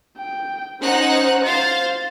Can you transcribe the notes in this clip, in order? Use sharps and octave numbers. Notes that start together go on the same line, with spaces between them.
G5
C#4 D#4 C5 F#5 F#6
C5 F5 A6